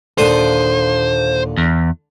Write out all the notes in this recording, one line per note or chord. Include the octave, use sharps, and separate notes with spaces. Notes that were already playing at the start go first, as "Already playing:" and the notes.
D#2 A#2 D3 D4 A4 C5 D#6
E2